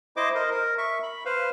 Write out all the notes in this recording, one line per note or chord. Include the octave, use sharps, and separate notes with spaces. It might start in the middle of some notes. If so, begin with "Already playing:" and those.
E4 C5 D#5 D6
A#4 C5 D#5
A#4
E5 C#6
B5
B4 C5 F5